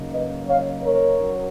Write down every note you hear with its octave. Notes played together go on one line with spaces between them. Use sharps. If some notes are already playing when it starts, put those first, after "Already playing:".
Already playing: C#3 F#3 A#3 D#4
B4 D#5
C#5 F5
A#4 C#5
F#3 C#4